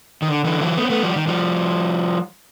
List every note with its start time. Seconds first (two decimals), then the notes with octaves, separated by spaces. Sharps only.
0.22 D#3
0.28 D3
0.45 D3 E3
0.61 E3 F#3
0.77 A3 B3
0.85 C4
0.90 A3 B3
1.03 F3 G3
1.16 D#3
1.27 F3 G3